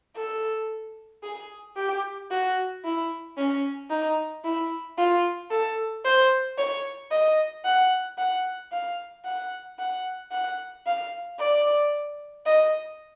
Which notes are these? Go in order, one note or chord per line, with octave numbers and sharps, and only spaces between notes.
A4
G#4
G4
F#4
E4
C#4
D#4
E4
F4
A4
C5
C#5
D#5
F#5
F#5
F5
F#5
F#5
F#5
F5
D5
D#5